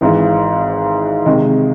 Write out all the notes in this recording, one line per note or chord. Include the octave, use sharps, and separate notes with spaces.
G#1 G#2 E3
C3 D#3 G#3